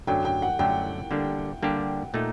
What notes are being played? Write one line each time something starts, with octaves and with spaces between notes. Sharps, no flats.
F#2 D3 F#3 A3 D4 G5
G5
F#5
F#2 D3 F#3 A3 D4 G5
D3 G3 A#3 D4 G4
D3 G3 A#3 D4 G4
A#2 A3 D#4